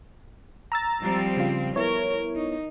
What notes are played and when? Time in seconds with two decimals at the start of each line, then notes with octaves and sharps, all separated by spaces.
0.72 A#5 E6 A6
1.01 F3 G3 C4
1.37 C#3 F4
1.76 B3 E4 A#4 C#5
2.36 D#4